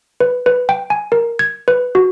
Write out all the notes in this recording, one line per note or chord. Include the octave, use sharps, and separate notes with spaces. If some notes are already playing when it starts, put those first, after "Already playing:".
B4
B4
G5
G#5
A#4
G#6
B4
F#4